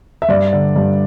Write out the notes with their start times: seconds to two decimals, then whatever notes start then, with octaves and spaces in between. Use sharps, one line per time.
0.22 E5
0.29 G2 D5
0.53 D3
0.76 G2